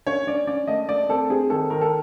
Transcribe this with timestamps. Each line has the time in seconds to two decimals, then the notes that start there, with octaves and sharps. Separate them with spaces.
0.07 C#4 C#5
0.27 C#4 D5
0.47 C#4 D5
0.67 A3 D#5
0.88 A3 D5
1.09 C4 A4
1.30 C4 G#4
1.50 D#3 A4
1.70 D#3 A#4
1.81 A4